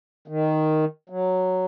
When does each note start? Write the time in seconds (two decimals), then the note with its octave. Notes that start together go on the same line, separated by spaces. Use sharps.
0.28 D#3
1.10 F#3